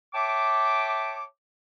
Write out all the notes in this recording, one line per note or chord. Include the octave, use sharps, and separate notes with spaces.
C#5 E5 G5 A5 D6